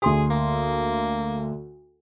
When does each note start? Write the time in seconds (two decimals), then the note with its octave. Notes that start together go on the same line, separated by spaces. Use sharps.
0.02 D2 G#4 C6 D#6
0.30 A#3